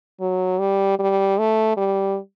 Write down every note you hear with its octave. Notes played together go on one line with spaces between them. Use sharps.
F#3
G3
G3
A3
G3